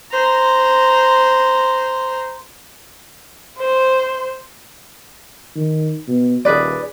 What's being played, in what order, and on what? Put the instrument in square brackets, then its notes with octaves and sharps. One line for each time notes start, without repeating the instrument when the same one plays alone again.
[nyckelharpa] C5 A#5
[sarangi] C5
[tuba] D#3
B2
[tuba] D#1 [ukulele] G#4 B4 D5